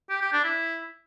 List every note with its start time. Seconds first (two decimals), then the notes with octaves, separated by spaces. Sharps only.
0.10 G4
0.22 G4
0.33 D4
0.44 E4